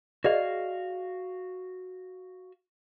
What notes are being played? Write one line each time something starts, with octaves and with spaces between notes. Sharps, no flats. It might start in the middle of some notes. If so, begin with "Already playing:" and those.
F#4 G#4 D5 D#5 F5